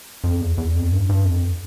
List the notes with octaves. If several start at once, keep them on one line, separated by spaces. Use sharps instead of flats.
F2
E2
E2
F2
G2
G2
F2